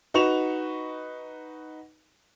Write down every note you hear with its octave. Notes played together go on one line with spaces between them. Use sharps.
D#4 F#4 B4 C#6 E7 F7